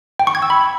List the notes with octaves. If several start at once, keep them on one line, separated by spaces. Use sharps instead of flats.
G5
C#6
G#6
E6
B5